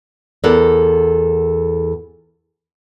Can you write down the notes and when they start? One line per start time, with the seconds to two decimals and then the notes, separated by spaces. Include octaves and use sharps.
0.44 E2 A4 A#4 D5 F#5